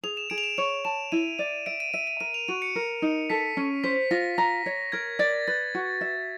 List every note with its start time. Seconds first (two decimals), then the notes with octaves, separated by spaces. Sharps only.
0.03 G#4 F7
0.17 E7
0.30 G#4 D7
0.38 F7
0.43 E7
0.58 C#5 F7
0.85 A5 E7
1.12 E4 D#7
1.38 D5 D#7
1.66 E5 D7
1.80 D#7
1.93 E5 D#7
2.07 D#7
2.20 A#4 D#7
2.34 F7
2.48 F#4 D#7
2.62 C#7
2.76 A#4
3.02 D#4
3.30 A4 B6
3.57 C#4
3.84 C5 B6
4.11 F4 A#6
4.38 A#5 A#6
4.66 C#5
4.92 A#4 G#6
5.19 D5 A6
5.48 B4 A6
5.75 F#4
6.01 E5